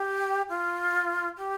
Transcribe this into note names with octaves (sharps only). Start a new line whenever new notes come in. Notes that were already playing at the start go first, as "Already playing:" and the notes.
Already playing: G4
F4
G4